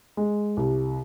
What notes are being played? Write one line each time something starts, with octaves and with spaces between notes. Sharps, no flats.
G#3
C2